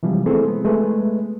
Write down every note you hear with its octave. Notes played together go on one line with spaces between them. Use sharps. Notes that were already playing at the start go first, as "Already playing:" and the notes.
C3 E3 F3 G3 G#3
A3 B3 C4 E4 G#4 A4
G#3 B3
G#3 A3 B4